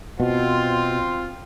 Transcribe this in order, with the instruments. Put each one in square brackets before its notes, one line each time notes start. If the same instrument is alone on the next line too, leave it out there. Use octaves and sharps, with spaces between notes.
[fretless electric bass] B2 [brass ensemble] C4 F4